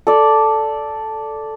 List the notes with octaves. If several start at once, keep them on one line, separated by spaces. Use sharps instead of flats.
A4 D5